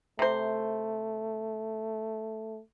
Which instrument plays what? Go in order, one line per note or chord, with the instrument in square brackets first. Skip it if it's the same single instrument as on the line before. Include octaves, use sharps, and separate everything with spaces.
[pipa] C3 C5 [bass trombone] A3